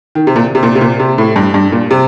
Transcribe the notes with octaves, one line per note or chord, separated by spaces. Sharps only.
D#3
C3
A#2
C3
A#2
C3
A#2
C3
A2
G2
G2
A#2
C3